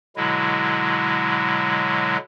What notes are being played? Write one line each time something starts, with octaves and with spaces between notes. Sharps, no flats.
B2 D3 F#3 G#3 E4